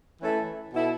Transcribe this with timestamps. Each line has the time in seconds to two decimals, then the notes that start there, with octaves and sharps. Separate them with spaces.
0.21 E3 A3 C#4 E4 A4
0.73 B2 B3 E4 A4